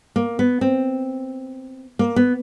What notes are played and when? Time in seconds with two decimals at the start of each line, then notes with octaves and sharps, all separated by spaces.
0.16 A#3
0.39 B3
0.61 C4
1.99 A#3
2.16 B3